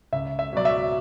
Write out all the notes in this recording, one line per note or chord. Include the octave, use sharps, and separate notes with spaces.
C#2 E5
E5
B2 F#3 D5
E5